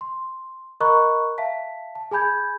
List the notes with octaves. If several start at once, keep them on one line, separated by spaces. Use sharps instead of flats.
C6
A#4 D#5 A#5 B5 C#6 F#6
E5 F5 A5 B6
A5
G#4 G#5 B5 G6 G#6